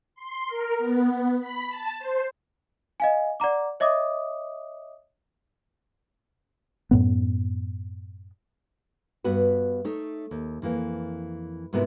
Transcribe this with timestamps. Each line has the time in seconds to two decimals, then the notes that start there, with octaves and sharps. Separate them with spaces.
0.15 C6
0.48 A#4
0.78 B3
1.40 B5
1.68 A5
1.99 C5
3.00 D#5 F5 G#5
3.40 D5 F#5 A#5 D6
3.80 C#5 D#5 E5 D6 D#6
6.91 F#2 A2 B3
9.24 G2 B3 F#4 B4
9.85 A3 D#4 C#5
10.31 D#2
10.62 F2 E3 A#3
11.73 G#2 C3 B3 E4 F#4 A#4